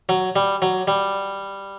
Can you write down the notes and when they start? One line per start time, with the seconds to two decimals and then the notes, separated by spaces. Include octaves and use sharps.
0.09 F#3
0.36 G3
0.62 F#3
0.88 G3